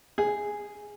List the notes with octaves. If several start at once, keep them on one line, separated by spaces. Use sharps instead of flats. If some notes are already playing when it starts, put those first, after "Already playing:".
G#4